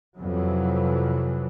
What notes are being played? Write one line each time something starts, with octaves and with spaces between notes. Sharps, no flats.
F2 C3 E3 F#3